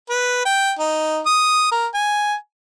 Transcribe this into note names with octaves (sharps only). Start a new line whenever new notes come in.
B4
G5
D#4
D#6
A#4
G#5